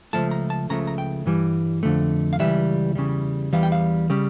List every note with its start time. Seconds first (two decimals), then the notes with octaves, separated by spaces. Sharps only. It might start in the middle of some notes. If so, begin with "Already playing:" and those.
0.13 C#2 C#3 F3 A3 A5
0.31 A#5
0.50 A5
0.69 C#2 C#3 F3 A3 A#5
0.87 A#5
0.98 G5
1.26 G2 E3 G3
1.83 F2 D3 A3
2.33 F5
2.40 C#2 C#3 E3 G3 E5
2.95 E2 C#3 E3 G3
3.53 E2 E3 G3 F5
3.63 G5
3.72 F5
4.10 C#3 G3